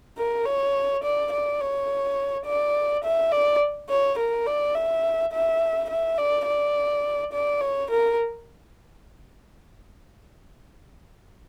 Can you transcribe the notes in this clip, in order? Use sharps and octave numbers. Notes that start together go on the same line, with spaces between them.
A#4
C#5
D5
D5
C#5
D5
E5
D5
C#5
A#4
D5
E5
E5
E5
D5
D5
D5
C#5
A#4